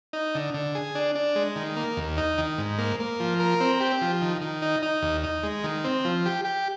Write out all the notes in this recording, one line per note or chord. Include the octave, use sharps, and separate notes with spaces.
D#4
D3
D3
G#4
D4
D4
G#3
D#3
A#3
D#2
D#4
D#3
G#2
A#3
A#3
F3
A#4
C4
G4
F3
D#3
D#3
D#4
D#4
D#2
D#4
G#3
D#3
C4
F3
G4
G4